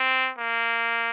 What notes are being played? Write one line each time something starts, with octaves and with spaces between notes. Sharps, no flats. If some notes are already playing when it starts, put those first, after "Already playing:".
Already playing: C4
A#3